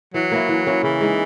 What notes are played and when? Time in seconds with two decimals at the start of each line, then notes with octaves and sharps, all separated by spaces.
0.14 E3 F#3
0.32 A#3 C#4 E4
0.49 E3
0.66 A#3 C#4 E4
0.83 C#3 E3
1.01 G#3 D#4